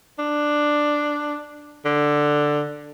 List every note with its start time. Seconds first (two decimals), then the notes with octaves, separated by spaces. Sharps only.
0.19 D4
1.85 D3